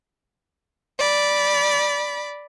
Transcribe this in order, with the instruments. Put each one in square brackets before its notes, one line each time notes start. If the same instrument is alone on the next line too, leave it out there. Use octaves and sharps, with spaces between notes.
[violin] D5 B5